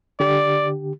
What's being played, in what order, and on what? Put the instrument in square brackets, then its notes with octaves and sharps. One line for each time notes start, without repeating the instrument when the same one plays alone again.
[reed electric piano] D3 G4 [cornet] D5